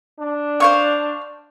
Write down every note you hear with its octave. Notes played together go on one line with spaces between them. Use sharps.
D4
C5 F5 C#6